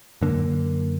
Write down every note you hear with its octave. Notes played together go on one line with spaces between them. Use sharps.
F#2 D3 A#3